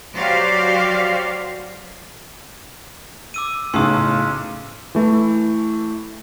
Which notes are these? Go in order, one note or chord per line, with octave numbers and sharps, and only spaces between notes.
F#3 F#4 G4 C5 D5 F5
D6 E6 D#7
B1 A2 C#3 C6 D#6
E3 A3 E4